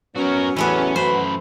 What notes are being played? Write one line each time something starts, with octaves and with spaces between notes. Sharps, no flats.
F#3 B3 C#4 F#4 A#4
A1 E2 E3 A3 B3 C#4
F#2 F#4 B4 C5 B5